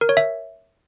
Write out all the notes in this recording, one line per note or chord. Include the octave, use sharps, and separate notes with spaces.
A#4
C#5
E5